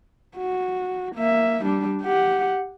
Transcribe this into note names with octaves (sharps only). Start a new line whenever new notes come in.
F#4
A#3 E5
G3 D4
G4 F#5